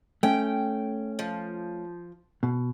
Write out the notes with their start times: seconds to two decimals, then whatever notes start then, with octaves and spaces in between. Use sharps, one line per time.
0.23 A3 C#4 G5
1.19 F3
2.43 B2